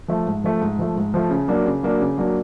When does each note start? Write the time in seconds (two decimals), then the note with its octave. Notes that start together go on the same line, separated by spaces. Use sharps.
0.08 F3 A3
0.26 G#2
0.44 F3 A3
0.61 G#2
0.79 F3 A3
0.96 G#2
1.14 F3 A3
1.30 C#3
1.48 F#3 A#3 D4
1.66 C#3
1.83 F#3 A#3 D4
2.00 C#3
2.18 F#3 A#3 D4